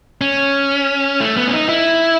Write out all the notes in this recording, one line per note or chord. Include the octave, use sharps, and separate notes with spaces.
C#4
A3
B3
C#4
D#4
E4